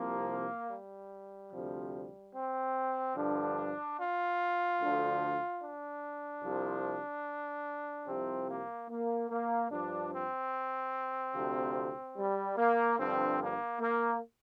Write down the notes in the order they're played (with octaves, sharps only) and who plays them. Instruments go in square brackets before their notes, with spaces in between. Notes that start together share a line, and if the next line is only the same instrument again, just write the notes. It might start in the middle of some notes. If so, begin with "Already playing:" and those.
Already playing: [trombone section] C2 C3 F3 A#3
G3
D2 C3 F3
C4
G2 D3 F3 D4
F4
D2 D3 F3
D4
C2 C3 F3
C2 C3 F3 C4
A#3
A#3
A#3
G2 F3 D4
C4
D2 C3 F3
G3
A#3
G2 D3 F3 C4
A#3
A#3